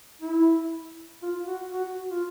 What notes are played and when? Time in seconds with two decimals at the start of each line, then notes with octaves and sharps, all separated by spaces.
0.22 E4
1.22 F4
1.47 F#4
1.73 F#4
2.10 F4